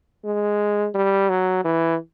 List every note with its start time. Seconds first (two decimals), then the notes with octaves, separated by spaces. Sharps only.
0.25 G#3
0.95 G3
1.30 F#3
1.65 E3